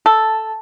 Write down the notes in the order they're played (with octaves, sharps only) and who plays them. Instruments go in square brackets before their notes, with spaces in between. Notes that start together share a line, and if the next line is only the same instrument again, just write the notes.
[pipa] A4